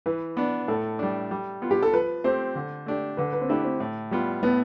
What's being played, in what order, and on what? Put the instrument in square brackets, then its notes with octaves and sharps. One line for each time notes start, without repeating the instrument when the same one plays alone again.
[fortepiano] E3 [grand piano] B4
[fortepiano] B3 D4
[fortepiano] A2 [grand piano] A4
[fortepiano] G3 D4
G3
B3 F4
[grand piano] G4
A4
[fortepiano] F3 [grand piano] B4
[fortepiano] A3 C4 G4 [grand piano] C5
[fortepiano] D3
A3 D4 G4
[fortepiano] D3 [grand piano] B4
[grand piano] B4
C4
[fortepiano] A3 E4 G4 [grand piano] D4
[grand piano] C4
[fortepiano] A2
G3 B3 F4
[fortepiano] A2 [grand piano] B3